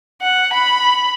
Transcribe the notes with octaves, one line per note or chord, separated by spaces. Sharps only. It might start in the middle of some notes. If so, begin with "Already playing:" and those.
F#5
B5